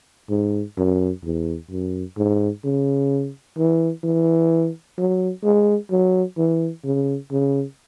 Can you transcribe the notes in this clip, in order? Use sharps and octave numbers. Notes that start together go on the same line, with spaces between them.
G#2
F#2
E2
F#2
G#2
C#3
E3
E3
F#3
G#3
F#3
E3
C#3
C#3